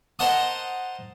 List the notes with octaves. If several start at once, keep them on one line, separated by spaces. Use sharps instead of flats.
A#4 C5 D#5 F#5 A5 D#6